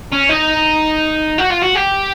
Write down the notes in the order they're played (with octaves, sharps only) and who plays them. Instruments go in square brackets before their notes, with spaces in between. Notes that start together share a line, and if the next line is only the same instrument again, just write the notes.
[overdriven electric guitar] C#4
D#4
F#4
F4
F#4
G4